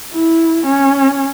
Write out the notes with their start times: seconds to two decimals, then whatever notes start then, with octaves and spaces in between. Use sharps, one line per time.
0.13 E4
0.65 C#4